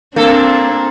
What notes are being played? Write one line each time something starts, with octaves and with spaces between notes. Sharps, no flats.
A#2 A#3 C4 D4 A4